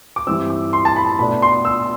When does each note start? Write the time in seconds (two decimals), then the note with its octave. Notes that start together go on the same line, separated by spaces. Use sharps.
0.16 D6
0.27 G2 E3 G3 C4 E6
0.50 D6
0.73 C6
0.85 A5
0.96 B5
1.19 B2 A3 D4 B5
1.42 C6
1.65 E6